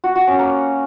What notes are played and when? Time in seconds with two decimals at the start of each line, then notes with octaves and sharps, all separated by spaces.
0.04 F#4
0.15 F#4
0.27 C#4
0.39 A#3